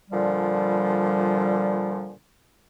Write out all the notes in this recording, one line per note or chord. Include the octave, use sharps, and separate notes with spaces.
A#2 D3 F3 G3